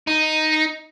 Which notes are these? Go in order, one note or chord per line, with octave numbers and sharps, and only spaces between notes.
D#4